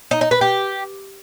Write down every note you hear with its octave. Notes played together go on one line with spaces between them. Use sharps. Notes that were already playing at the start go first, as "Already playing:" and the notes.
D#4
D#4
B4
G4